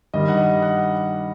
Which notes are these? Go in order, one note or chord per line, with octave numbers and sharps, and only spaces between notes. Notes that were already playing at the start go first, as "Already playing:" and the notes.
G2 D#3 G3 D#5
F#5
D#5
F#5